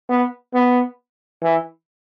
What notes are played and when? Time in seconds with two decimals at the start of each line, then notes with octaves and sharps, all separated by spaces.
0.10 B3
0.54 B3
1.43 E3